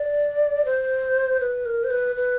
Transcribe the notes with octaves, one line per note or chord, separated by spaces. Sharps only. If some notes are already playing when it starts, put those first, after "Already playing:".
Already playing: D5
C5
B4
A#4
C5
B4
B4